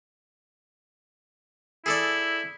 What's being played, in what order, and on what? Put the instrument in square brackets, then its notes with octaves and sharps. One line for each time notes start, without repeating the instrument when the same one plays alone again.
[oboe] E4 [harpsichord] G#4 A4 D5